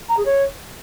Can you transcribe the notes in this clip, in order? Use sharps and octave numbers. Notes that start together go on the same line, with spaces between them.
A#5
G#4
C#5